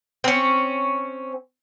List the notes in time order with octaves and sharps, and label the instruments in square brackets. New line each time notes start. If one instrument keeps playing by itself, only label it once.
[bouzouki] C4 C#4